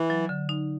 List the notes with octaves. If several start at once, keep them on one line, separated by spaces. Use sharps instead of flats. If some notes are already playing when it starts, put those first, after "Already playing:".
Already playing: E3
F#3
D3
D#4